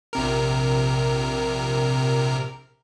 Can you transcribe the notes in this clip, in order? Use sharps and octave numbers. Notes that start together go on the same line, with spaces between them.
A#1 C3 A#4